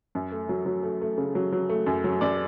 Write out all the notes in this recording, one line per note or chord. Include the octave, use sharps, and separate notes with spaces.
F#2
A3
F#3
F#3
A3
A3
C#3
F#3
F#3
A3
F#2
F#3
F#2 D5